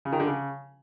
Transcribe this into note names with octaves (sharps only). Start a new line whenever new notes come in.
C#3
D#3
D3
C#3